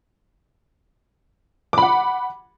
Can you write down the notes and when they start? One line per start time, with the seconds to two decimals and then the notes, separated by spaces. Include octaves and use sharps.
1.73 D6
1.78 B5
1.82 F#5